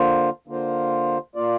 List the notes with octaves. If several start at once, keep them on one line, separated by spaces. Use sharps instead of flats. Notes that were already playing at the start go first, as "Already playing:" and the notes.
Already playing: D3 A#3 F4 C5
D3 A#3 F4 C5
A#2 A#3 F4 D5